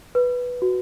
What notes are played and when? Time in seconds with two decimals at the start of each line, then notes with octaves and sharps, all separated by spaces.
0.15 B4
0.62 F#4